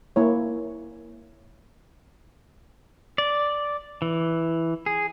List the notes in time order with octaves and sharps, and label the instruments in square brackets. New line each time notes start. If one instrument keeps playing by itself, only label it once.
[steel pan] A#3 E4 C#5
[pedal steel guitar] D5
E3
G#4